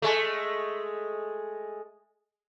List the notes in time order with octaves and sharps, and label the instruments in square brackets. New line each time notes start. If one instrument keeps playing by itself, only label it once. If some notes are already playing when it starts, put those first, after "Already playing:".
[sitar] G#3 A3